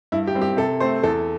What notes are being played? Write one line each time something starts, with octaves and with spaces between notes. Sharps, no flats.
G2 E4
G4
G3 C4
G4
C3 A4
A3 C4 C5
E2 A4